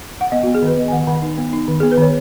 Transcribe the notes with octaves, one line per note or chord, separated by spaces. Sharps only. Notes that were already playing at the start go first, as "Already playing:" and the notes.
F#5
B3 D#5
F#4
B3
G#4
D#3 B4
B3 D#5
G#5
D#3 F#5
D#3 F#5
D#4
B3
D#4
D#3
B3 G#4
B4
D#3 C#5